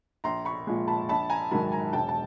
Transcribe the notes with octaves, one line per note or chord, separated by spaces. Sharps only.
A#1 A#5 C6
B5 C#6
A#2 F3 G#3
A5 B5
A#1 A5 B5
G#5 A#5
G#2 D#3 F#3 A5 B5
G#5 A#5
E1 G5 A5
A5